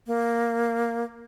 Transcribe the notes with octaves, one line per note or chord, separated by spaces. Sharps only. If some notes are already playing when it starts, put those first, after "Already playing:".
A#3